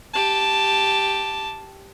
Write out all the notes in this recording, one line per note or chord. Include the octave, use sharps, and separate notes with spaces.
G4 A5